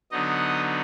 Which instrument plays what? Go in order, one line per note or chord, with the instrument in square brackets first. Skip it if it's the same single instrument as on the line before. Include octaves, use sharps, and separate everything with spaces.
[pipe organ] D3 F#3 B3 D#4 D#5